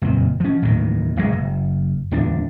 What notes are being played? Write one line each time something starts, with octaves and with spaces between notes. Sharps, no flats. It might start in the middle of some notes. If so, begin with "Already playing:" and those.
F#1 F2 A#2
F3 C#4
A1 D#2 A2 D#3
F1 A#1 G#2 G#3
F#1
D1 E2 F3 D4